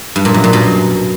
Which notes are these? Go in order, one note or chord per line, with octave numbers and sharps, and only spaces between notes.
G2
A#2
F#2
A#2
B2